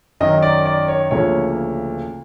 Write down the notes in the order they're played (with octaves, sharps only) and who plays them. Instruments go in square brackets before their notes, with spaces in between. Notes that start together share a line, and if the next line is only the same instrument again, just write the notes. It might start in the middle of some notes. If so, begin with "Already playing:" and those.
[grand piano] F#2 D#3 F#3 D#5
D5
D5
C#5
D2 C#3 F3 A#3 C#5